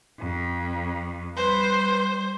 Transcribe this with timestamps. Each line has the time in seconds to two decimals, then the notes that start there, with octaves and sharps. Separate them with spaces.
0.19 F2
1.37 G3 B4 C5